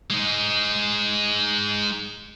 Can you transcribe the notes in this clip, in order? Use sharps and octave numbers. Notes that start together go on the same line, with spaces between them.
G#3 D#4